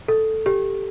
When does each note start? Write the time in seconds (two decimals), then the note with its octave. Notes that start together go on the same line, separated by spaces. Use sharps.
0.08 A4
0.46 G4